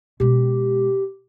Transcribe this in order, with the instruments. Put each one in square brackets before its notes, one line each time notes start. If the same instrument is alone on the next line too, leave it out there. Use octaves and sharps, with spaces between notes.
[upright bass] B2 G#3 [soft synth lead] G4